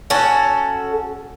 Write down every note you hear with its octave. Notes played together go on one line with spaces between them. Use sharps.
C#4 F#4 A4